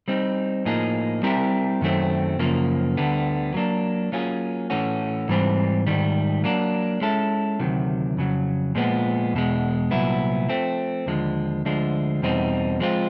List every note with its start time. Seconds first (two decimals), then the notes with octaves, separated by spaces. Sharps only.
0.08 G3 C4 D#4
0.65 A2 F3 A#3 D#4 G#4
1.23 G3 C4 E4 G4 A#4
1.81 F#2 D#3 F#3 A3 C4
2.39 F#2 C#3 F3 A#3
2.97 D2 D3 G3 B3
3.54 F#3 A#3 D4
4.12 F#3 A#3 C#4 F4 G#4
4.70 A2 E3 A3 C#4 F#4
5.29 G#2 E3 G3 C4
5.87 G#2 D#3 G3
6.44 F#3 A#3 D4
7.01 G#3 C#4 E4 A4
7.60 D2 C3 D#3 F#3
8.17 F2 C#3 F#3
8.75 A#2 F3 G#3 B3
9.33 E2 B2 G#3
9.91 C2 A#2 F#3 B3 E4
10.49 F3 A3 C4
11.06 D#2 D3 F3 G#3
11.65 D2 D3 F3 G#3
12.22 E2 B2 G3 C4 D#4
12.80 F3 G#3 C4 F4